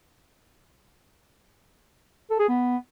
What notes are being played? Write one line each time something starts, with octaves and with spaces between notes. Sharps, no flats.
A4
G#4
B3